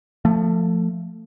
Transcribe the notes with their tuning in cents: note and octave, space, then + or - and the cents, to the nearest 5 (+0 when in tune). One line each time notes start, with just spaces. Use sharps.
F3 +0 A3 +15